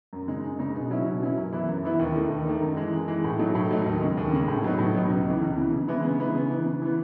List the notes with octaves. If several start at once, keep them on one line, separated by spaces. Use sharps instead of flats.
F#2
C#3 G#3 D#4
F#2
C#3 G#3 D#4
B2
F#3 C#4 E4
B2
F#3 C#4 E4
F#2
E3 B3 E4
F#2
E3 B3 E4
D#2
D#3 A3 D#4
D#2
D#3 A3 D#4
F#2
E3 G#3
F#2
E3 G#3
A2
F#3 A3 D#4
A2
F#3 A3 D#4
D#2
C#3 G#3
D#2
C#3 G#3
A2
F#3 B3 D#4
A2
F#3 B3 D#4
C#2
C#3 E3
C#2
C#3 E3
C#3
E3 G#3 B3 E4
C#3
E3 G#3 B3 E4
C#3
E3 B3
C#3
E3 B3